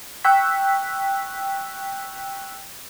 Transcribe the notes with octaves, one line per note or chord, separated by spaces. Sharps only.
G5 C#6 E6 F#6 G6 B6